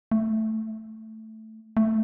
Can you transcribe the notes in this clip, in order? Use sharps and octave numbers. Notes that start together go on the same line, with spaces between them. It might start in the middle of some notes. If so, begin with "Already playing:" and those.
A3
A3